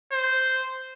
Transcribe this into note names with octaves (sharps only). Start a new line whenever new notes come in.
C5